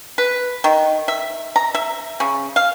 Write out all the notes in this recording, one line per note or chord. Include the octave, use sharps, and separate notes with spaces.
B4
D#3
E5
A#5
E5
C#3
F5